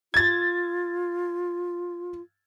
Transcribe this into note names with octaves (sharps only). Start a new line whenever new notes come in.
F4 G#6 A6